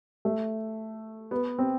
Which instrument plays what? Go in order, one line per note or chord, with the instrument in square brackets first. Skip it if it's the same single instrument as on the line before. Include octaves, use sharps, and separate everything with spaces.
[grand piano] A3
B3
C4